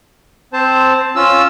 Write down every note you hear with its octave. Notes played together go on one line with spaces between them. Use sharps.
C4 C5 A5
C#4 F4 E6